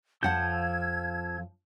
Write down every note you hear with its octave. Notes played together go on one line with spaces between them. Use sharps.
F2 F3 F#5 A5 E6 G6 G#6